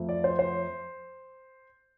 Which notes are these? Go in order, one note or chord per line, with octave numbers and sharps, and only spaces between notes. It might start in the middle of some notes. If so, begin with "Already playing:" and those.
Already playing: F2 F3 A3
D5
C5
C5